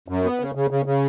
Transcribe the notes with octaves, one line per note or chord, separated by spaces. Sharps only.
F#2
B3
C#3
C#3
C#3
C#3